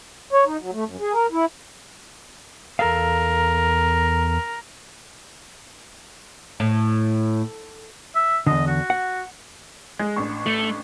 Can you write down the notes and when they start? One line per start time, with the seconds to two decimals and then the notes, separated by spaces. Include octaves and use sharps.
0.33 C#5
0.46 D#4
0.60 F#3
0.72 A3
0.87 F#2
1.00 G#4
1.13 A#4
1.32 E4
2.79 E2 A4 A#4 F5
6.60 A2
8.15 E5
8.46 E2 D3 D#5
8.67 F#4
8.90 F#5
9.99 G#3
10.16 A1 D4 C#6
10.46 A3